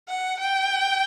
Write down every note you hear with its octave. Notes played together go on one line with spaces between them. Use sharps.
F#5
G5